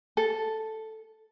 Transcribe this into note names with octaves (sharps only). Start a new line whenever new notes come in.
A4